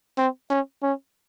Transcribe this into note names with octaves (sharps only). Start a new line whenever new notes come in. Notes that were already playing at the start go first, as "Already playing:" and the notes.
C4
C#4
C#4